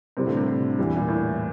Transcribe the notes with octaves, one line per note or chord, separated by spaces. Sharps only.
A2 C3 G3 C4
D3
C3
D3
E2 E3 G3
A#2
A2